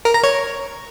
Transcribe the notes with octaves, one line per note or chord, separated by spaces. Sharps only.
A#4
A#5
C#5